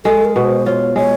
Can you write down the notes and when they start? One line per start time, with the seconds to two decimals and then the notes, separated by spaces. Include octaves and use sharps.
0.05 G#3 A4
0.25 A#4
0.35 B2 B4
0.45 C5
0.66 F4 C#5
0.96 G#3 C#5